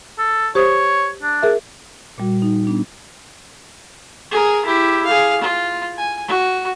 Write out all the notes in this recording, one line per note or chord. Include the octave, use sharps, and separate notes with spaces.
A4
G4 C5 C#5 D#6
D4
G#4 A#4 E5
A#2 G3 F#4
D#4
B3 D4
G#4 A#4
E4 G4
G#4 F5
F4
G#5
F#4